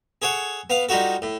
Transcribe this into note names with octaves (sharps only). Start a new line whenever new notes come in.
G#4 A4 C#5 F#5
B3 F5
G3 D#4 F4 F#4 A4
A2